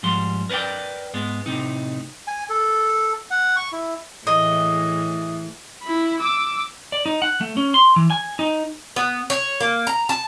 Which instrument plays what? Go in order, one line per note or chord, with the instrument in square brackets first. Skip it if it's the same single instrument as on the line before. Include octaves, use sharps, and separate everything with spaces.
[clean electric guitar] G#2 F3 G3 C6
A#4 B4 C#5 D5 G5
G#2 G#3 B3
A2 C3 D#4
[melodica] G#5
A4
F#5
C#6
E4
[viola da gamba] A2 E3 G#4 [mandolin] D#5
[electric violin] E4 B5
D6 E6
[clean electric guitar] D5
D#4
F#5
A3
C#4
C6
E3
G#5
D#4
[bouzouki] B3
C#5
A#3
A#5
A5